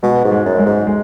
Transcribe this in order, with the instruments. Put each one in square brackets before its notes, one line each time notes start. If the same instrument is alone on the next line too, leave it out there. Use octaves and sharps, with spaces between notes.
[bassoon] B2 [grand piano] G#3
[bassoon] G#2
[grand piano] G#3
[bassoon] F#2
[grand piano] G#3
[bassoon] G#2
[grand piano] G#3